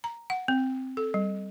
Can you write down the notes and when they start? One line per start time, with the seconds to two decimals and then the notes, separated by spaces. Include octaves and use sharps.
0.04 A#5
0.30 F#5
0.48 C4
0.97 A4
1.14 G3